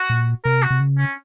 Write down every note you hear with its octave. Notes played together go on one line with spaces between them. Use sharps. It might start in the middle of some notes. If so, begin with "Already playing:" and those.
Already playing: F#4
A#2
C3 A#4
F#4
C3
C#3
C#4